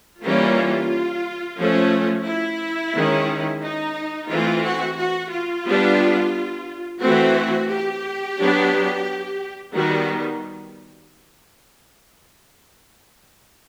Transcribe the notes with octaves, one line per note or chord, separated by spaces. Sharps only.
E3 G3 A#3 C#4 F4
F3 A3 C#4
E4
D#3 G#3 C#4
D#4
E3 A3 C4 F4
F#4
F#4
F4
G3 B3 D4
E3 A3 C4 F#4
G4
F#3 B3 D4
D#3 G3 B3 F#4